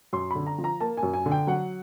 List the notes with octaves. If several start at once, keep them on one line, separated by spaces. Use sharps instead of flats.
F#2 C6
D3 B5
A#5
F3
A#5
A#3 A5
G#5
F#2
G#5
D3
G5
F#3 F#5